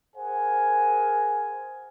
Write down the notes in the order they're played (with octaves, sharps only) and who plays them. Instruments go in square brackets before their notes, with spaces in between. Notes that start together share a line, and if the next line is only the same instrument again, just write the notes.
[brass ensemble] G#4 A#4 C5 F#5 G#5